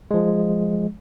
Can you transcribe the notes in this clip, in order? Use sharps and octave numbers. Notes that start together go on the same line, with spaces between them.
F3 G#3